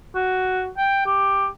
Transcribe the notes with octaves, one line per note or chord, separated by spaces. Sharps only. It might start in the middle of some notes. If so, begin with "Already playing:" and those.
F#4
G5
G4